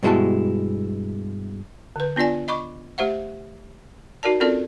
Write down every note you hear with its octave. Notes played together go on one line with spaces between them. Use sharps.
G2 B2 G#3 E4 F#4 A5
D3 B4
B3 D4 F4 D5 G#5
D#5 B5 C#6 D6
A3 G4 C5 E5 F#5
D#4 F#4 A#4 D5 A5
C4 C#4 F4 A4 A#4 D5